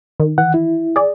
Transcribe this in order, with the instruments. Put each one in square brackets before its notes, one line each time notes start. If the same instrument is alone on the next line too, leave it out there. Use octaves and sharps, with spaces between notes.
[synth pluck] D#3
[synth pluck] E3 [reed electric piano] F#5
[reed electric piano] E4
[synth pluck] G#4 D5